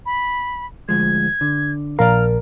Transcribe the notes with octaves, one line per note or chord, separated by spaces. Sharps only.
B5
D2 F3 G#3 G#6
D3
A#1 A#4 D5 F5 F6